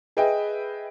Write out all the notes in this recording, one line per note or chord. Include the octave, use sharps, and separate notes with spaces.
G#4 B4 D#5 E5 G5